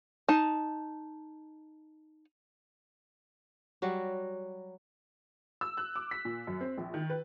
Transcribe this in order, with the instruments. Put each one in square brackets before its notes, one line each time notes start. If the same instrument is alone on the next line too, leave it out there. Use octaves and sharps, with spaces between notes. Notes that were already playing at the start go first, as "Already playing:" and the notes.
[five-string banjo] D#4 A5
[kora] F#3 G3 F#4
[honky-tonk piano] E6
F#6
D6
B6
A#2
F#2
C4
A#1
D#3
B4